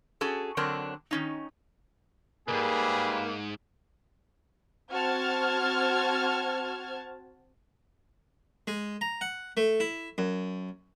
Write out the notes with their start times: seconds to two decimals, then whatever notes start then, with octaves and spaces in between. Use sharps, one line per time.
0.21 C#4 F#4 G#4 A4
0.57 D3 F#3 C4 D4 A#4 C#5
1.11 D#3 C#4 D#4
2.48 C#2 G#2 G3 A#3 G#4 B4
4.93 C4 F#4 C5 A5 F6 G#6
8.67 G#3
9.01 A#5
9.21 F#5
9.57 A3
9.80 E4
10.18 F#2